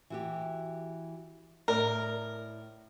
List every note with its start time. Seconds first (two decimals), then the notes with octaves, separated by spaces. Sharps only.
0.10 E3 F#4 G4
1.68 A2 A#4 D5